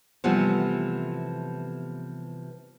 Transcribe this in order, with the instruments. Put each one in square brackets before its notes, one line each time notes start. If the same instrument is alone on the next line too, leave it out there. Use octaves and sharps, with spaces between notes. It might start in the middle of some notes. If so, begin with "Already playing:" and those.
[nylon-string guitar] C3 E3 F3 G3 A3 B3